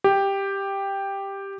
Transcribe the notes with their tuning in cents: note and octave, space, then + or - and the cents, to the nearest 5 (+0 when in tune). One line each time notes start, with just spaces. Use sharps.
G4 +5